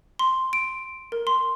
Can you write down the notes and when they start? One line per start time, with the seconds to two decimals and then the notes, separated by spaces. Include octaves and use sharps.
0.19 C6
0.53 D7
1.12 A#4
1.27 C6